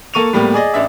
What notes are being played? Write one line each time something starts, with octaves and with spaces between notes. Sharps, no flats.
A#3 A4 C#6 D#7 F7
A2 G3 A#3 B3
G#4 D5 D#5
A1 D4 E5